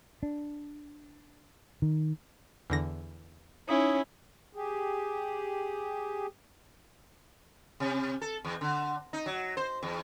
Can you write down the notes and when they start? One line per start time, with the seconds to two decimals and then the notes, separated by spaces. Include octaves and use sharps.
0.23 D4
1.82 D#3
2.70 E2 D3 A#6
3.68 C#4 D#4 E4 C#5
4.53 G4 G#4
7.80 C3
8.21 A4
8.45 E2
8.61 D3
9.13 D#4
9.26 F#3
9.57 C5
9.83 E2